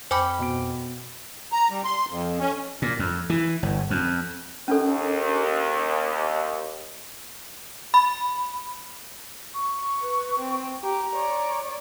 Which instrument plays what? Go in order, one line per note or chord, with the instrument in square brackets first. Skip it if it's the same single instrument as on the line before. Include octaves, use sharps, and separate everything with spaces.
[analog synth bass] F2 [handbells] C5 G#5 D6 [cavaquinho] G5 B5
[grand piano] B2 D7
[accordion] A#5
G3
C6
F2
C#4
[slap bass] A#2
F2
E3
G1
F2
[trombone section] D#2 [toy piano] C#4 D4 A4
[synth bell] B5
[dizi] C#6
[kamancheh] B4
C4
[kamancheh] G4 [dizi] A#5
[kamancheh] C#5 D5